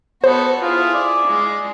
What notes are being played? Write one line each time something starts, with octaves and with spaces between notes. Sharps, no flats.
B3 F#4 A4 C5
E4 F4 G#4
D5
G#3